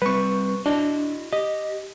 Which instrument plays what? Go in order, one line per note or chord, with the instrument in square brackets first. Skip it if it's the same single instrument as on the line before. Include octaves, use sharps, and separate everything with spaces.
[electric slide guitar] G3 C4 [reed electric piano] B4 C#6
[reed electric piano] D4 [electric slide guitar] E4 F#4 D#5
[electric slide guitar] G4 [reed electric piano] D#5